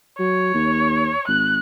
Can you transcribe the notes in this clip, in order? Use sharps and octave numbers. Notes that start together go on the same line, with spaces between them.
F#3 C#5
D#2
G#1 F#6